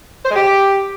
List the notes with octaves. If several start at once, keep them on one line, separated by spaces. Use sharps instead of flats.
C5
G#3
G4